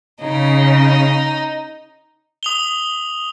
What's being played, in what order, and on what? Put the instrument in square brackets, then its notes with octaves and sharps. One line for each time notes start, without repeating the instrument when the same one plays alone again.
[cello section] C#3 [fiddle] D#4
[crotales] D#6 F7 G7